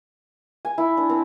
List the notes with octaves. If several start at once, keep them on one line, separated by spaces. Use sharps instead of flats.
G#5
E4
D4
C4